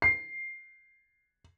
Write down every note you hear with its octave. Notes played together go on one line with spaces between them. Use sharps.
C7